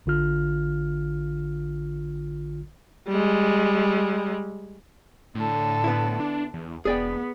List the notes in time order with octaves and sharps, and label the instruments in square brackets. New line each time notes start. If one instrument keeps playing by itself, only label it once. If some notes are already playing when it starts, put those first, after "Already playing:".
[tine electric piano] A1 D3 F4 F6
[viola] G3 G#3
[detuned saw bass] A2 [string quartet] D3 A4
[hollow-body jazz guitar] B3 E4
[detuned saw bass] D4
E2
[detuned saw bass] E1 [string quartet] B3 [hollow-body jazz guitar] G#4 D5 G5